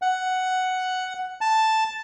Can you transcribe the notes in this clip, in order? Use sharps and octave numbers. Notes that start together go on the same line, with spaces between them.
F#5
A5